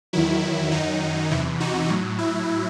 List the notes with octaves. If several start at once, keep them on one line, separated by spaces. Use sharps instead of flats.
E2 D#3 F#3 E4
F#2 D#3 F#3 D#4
E2 C3 E3 E4
D#4 F#4
A2 F#3
E4